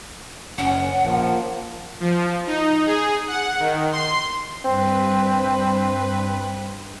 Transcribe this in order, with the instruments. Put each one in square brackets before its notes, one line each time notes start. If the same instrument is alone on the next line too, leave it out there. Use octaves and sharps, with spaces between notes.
[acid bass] F#1 [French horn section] C#4 [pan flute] F#5
[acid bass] A#1 [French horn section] F3 A#3
[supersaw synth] F3
D#4
G#4
F#5
D#3
C6
[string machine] G2 B4 [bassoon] C4